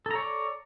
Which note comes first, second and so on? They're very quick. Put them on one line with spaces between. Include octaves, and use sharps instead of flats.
A4 A#5 C#5 D5